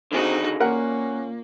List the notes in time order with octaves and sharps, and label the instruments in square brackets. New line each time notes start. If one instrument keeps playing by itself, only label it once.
[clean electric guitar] D3 D#3 G#4 [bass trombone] C4 [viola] D#4 F#4
[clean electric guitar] A#2 [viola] A#3 [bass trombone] C#4 [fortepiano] A#4 F#5